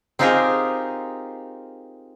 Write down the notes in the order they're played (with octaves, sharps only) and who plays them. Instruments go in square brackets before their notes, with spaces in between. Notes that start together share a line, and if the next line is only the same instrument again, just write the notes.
[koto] C4 D#4 F4 G4 G#4 A#4